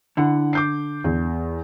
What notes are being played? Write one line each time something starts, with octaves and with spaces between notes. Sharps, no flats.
D3 E4 F#5
D6 G6 C7
E2